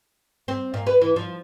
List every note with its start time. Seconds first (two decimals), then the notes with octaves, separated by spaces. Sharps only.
0.48 C4
0.74 A#2
0.87 B4
1.01 E3
1.16 F3